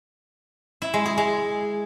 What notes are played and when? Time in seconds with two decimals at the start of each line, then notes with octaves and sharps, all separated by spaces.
0.82 E4
0.94 G#3
1.06 G#4
1.18 G#3